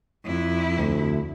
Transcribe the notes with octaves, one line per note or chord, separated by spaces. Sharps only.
F2 E4
D2